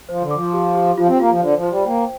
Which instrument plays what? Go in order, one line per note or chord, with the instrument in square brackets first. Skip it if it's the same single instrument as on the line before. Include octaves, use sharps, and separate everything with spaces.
[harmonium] F3 [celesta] C5
[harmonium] D3
[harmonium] F3 [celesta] D6
[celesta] G4
G4
[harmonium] F3 [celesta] F4
[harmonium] C4
[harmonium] A#3 [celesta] F4
[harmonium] F3
[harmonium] D3 [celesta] C5
[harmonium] F3
[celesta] C5
[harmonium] G3
[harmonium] A#3 [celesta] G5